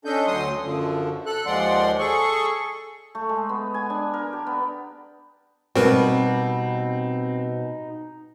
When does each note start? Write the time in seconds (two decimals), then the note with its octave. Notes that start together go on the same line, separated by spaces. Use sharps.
0.05 C#4 D4 A4 D#5 G6
0.27 D2 F#3 C6 D#6
0.62 F#2 D3 F3
1.26 A4 F#6
1.46 D#2 F3 G#3 D5 F#5 C6
1.99 G#4 A4 C#6
3.15 A3
3.29 G#3
3.49 B3
3.74 G#5
3.90 D4
4.14 A#4
4.33 G4
4.46 B3
5.75 B2 G3 C4 D#4 F#4 A#4 B4